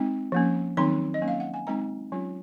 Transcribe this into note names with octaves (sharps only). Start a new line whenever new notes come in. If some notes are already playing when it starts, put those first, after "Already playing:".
Already playing: G#3 C4 D#4
F3 A#3 C#4
D#3 F#3 C4 D#4 C6
D#5
F#3 A#3 C#4
F5
F#5
G#5
G#3 C4 D#4 A#5
F#3 C#4 F4